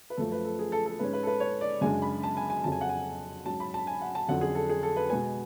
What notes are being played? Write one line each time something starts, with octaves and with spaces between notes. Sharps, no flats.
B4
F#2 F3 A3 A4
B4
A4
G#4
A4
A4
G#2 G#3 C#4 B4
B4
A4
B4
C#5
D5
F#2 C#3 G#3 D4 G#5
B5
A5
G#5
G#5
F2 C#3 F#3 A5
G#5
F#5
G#5
G#2 F#3 C#4 A5
B5
A5
G#5
F#5
A5
F2 D3 F#3 C#4 F#5
G#4
A4
G#4
A4
B4
B2 G#3 B3 G#5